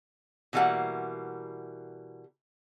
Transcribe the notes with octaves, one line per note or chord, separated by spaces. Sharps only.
B2 E3 G3 A#3 F#5